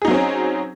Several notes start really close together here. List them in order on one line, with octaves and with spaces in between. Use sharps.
G#4 D#4 F#3 C4 C#4